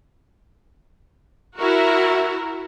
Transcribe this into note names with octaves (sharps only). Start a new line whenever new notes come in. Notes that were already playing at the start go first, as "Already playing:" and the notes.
E4 F#4 A#4